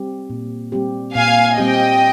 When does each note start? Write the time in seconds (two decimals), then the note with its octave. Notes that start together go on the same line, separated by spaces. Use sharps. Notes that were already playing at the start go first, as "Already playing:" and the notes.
Already playing: G3 C4 G4
0.30 A#2
0.72 G3 C4 G4
1.15 A#2 F5 G#5
1.57 G3 C4 G4 D#5 G5